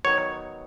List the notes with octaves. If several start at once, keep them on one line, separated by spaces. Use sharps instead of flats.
D#3 F#3 B3 D#4 C#5